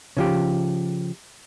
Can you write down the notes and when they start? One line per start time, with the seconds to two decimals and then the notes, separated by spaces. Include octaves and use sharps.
0.17 C#3 F3 G4